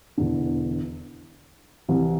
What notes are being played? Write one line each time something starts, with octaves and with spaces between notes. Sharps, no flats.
E1 E2 D3
C2 C3 E3